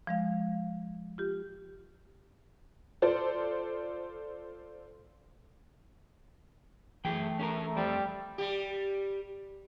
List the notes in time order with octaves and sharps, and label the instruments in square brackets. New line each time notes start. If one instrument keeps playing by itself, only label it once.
[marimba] F3 G#3 F5
F4 G4
[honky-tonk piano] F4 A4 C5 D5
[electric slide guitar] F#2 G#4 G5 [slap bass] E3 [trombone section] A3
[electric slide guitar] C#4 A4 A#4
[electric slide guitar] F2 C4 [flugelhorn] G3
[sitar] G3 G4